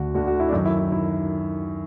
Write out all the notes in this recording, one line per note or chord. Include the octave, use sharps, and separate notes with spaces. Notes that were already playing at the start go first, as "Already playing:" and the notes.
Already playing: D2 D3 F#4
D2 D3 F#4
F#4
E4
D4
F#2 D#3 D#4
E4
E4
D#3 E4